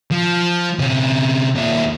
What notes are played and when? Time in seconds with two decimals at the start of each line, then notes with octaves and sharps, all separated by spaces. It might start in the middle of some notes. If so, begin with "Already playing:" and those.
0.11 F3
0.79 C3 C#4
1.55 D#2 E5